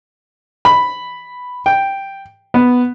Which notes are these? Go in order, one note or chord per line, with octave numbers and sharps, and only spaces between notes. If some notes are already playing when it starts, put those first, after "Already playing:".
B5
G5
B3